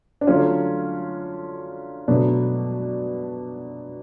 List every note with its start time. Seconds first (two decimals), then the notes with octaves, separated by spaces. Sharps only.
0.21 D4
0.27 D3 F#3 A3 C#4 F4
2.08 B2 F#3 A3 B3 D4